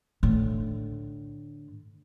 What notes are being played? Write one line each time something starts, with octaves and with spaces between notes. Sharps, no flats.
A2 D3